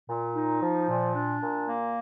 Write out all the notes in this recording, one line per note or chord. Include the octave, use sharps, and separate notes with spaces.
A#2
D#4
F3
A#2
D4
A#2
A#3